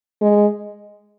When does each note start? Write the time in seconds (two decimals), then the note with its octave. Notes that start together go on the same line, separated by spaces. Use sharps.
0.22 G#3